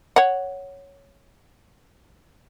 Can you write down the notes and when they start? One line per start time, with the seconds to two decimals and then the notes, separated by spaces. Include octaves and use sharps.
0.16 C#5 F#5